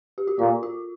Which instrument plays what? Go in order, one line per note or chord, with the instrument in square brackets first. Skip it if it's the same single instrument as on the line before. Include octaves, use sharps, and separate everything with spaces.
[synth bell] G4
F#4
[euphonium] A#2 [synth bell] F4
[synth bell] F#4